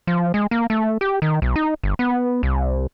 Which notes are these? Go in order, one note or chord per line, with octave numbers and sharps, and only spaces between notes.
F3
G#3
A#3
A3
G4
D#3
B1
D#4
G1
B3
C2